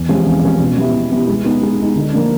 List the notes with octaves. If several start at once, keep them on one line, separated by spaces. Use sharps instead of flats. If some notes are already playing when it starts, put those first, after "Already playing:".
Already playing: E2
C3 F3 G#3 C#4
E2
C3 F3 G#3 C#4
B2
G3 B3 E4
B2
G3 B3 E4
G#3
B3 D#4
G#3
B3 D#4
D3
F3 A#3 D4